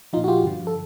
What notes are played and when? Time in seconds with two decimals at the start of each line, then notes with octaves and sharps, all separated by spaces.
0.13 F3 D#4 F4
0.17 A#2
0.24 F#4
0.28 F4 G4
0.43 G2 D3 F3
0.67 A4